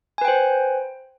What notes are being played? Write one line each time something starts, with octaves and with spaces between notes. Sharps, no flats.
B4 C5 G5 G#5